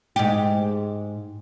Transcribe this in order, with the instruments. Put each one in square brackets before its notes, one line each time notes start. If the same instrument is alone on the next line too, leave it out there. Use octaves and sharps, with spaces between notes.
[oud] G#2 G4